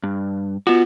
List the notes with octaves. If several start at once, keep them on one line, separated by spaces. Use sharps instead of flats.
G2
B3 F4 F#4